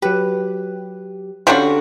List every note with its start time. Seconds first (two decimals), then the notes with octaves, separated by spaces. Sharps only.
0.02 F#3 G4 B4
1.47 D3 G3 C#4 D4 F4 F#4